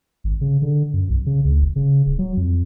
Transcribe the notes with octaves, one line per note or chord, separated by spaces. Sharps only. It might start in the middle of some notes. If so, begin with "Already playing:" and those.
G#1
C#3
D3
F#2
B1
C#3
D2
F#1
C#3
D1
F#3
F2